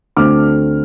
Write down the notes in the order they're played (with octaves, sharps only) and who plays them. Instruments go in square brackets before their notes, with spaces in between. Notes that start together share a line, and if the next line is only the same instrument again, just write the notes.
[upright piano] D2 D3 A3 C4 D6 F6